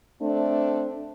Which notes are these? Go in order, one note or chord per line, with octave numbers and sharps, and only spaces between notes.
A3 C4 D4